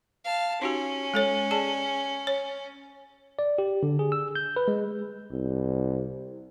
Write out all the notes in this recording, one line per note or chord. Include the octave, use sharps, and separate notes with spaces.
F5 A5
C#4 D#4 F#4 G4
G#3 A4 C#5
G#4 D5 A5
C#5
D5
G4
D3
G#4
E6
G6
B4
G#3
C2